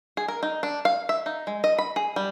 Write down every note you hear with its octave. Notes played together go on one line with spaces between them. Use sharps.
G#4
A#4
D#4
D4
F5
E5
D#4
G#3
D#5
B5
G#4
G3